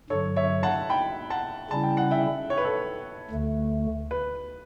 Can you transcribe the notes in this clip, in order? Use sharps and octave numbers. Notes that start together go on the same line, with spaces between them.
G2 D3 F#3 A4 C#5
C#5 E5
F#5 A5
G5 B5
F#5 A5
C#3 G3 C#4 E4 A5
G5
F#5
E5 G5
C#5
B4
A4 C#5
D2 D3 A3
B4